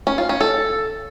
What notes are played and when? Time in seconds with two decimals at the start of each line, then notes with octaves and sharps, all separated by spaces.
0.07 C#4
0.18 F4
0.29 C#4
0.41 A4